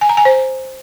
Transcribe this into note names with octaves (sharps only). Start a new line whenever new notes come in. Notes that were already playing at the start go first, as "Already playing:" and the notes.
G#5
A#5
G#5
C5